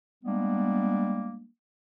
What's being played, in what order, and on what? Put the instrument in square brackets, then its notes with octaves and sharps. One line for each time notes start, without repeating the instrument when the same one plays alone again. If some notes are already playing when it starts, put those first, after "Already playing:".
[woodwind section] G3 G#3 A#3 B3 D4